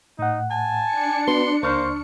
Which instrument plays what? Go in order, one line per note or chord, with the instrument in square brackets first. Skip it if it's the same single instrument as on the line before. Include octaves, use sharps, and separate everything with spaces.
[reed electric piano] A2 F#5 [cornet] D#4
[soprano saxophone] G#5 [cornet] A5
[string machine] D4 C#7
[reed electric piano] B3 F#4 B4 [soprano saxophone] C6
[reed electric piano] C#2 C#6 F6 [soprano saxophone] A#3 [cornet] C5